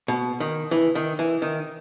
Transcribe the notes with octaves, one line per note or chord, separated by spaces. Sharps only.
B2
D#3
E3
D#3
E3
D#3